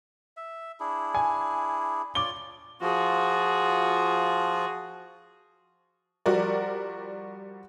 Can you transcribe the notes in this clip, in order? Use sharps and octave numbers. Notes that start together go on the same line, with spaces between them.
E5
D4 E4 G#4
G#5
F4 C#5 D5 D6 G7
F3 F4 F#4 G#4
F3 G3 F#4 A#4 D5